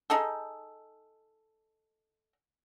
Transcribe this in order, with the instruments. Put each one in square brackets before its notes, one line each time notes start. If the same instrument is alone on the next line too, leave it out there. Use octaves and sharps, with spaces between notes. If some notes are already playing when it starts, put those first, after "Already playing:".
[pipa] D#4 G#4 A4